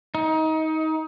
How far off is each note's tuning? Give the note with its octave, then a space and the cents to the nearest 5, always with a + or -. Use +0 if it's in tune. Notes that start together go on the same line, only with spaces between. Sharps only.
D#4 +25